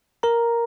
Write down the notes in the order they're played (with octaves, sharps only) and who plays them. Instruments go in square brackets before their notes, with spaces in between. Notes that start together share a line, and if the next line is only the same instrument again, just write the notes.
[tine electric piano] A#4 A#5